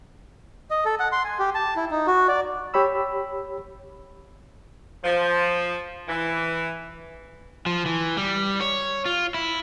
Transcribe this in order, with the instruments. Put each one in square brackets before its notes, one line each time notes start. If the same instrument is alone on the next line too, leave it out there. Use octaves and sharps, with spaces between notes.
[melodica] D#5
A4
F#5
C6
G#5
G4
A5
E4
D#4
F#4
D5
[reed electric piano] G4 C#5 B5 E6
[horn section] F3
E3
[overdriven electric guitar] F3
E3
G3
C#5
F4
E4